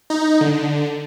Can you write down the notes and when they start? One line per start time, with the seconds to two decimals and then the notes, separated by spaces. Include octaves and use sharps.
0.10 D#4
0.41 D3